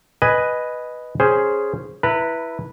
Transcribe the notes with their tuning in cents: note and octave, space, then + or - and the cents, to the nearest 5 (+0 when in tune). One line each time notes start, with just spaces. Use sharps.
B4 +0 D#5 +0 G#5 +0
C#4 +0 G#4 +0 C5 +0
E4 +0 B4 -10 A#5 -40